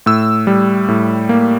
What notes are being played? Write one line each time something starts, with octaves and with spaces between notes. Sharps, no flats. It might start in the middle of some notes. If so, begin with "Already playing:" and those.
A2 E6
G3
A2
A#3